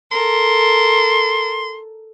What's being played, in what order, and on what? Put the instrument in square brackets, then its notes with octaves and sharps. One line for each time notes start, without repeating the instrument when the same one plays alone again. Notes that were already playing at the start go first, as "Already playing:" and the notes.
[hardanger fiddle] A4 A#4 [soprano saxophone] C6